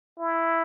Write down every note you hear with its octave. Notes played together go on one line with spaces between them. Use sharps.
E4